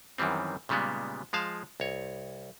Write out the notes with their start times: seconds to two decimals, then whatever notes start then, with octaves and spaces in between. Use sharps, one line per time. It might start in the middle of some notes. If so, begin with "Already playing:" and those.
0.18 F#2 D#3 E3 G3 C4
0.69 A#2 C#3 G3 G#3 B3
1.33 F3 G#3 F5 A5
1.80 C2 C#5